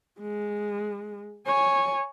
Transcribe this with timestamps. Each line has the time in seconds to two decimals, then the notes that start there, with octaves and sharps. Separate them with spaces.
0.19 G#3
1.46 C#5 G#5